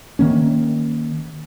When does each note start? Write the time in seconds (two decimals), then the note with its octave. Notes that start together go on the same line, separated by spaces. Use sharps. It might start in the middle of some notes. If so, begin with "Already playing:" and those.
0.19 D#3 A#3 C#4